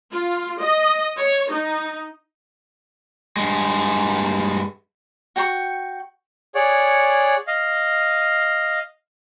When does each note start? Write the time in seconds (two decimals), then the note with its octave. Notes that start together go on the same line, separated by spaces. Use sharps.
0.13 F4
0.60 D#5
1.19 C#5
1.51 D#4
3.37 G2 G#3
5.36 F#4 G5 A#5 C#6
6.55 G#4 C#5 D5 F#5
7.48 D#5 F5